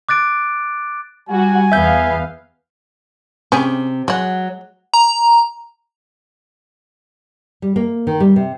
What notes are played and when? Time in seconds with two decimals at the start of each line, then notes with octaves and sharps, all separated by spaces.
0.09 D6 F#6 A6 D7
1.29 G3 F#4 G#5
1.72 E2 B3 E5 F5 G6
3.52 C3 C#4 G4 G#4
4.08 F#3 G#3 F#5
4.94 A#5
7.62 G3
7.76 A#3
8.07 D#3
8.20 G3
8.36 C3